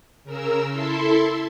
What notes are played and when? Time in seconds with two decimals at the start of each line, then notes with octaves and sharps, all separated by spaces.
0.24 C#3 A#4 E6
0.69 E4 A4 E5 C6